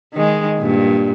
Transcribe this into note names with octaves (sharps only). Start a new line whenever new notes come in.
D#3 G#3
G2 A#2